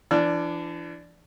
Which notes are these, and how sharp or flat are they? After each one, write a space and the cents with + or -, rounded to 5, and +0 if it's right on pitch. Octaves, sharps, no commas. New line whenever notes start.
E3 +40 D4 +0 E6 +45